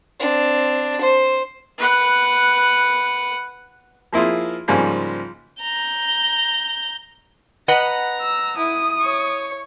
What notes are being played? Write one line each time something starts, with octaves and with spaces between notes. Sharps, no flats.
C4 D4
C5
B4 F#5
F3 A#3 E4 F4 G#4
G#2 C#3 F3 G3 A#3
A#5 G6
B4 D#5 F#5 A#5
E6
E4 D#6
C#5 C#6